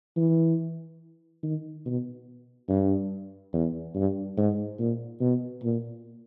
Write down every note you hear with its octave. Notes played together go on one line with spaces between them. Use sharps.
E3
D#3
B2
G2
E2
G2
G#2
A#2
B2
A#2